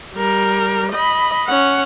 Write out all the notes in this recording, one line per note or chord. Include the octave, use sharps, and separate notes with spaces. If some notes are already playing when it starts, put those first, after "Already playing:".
G3 A#4
D#5 B5
C#4 F#5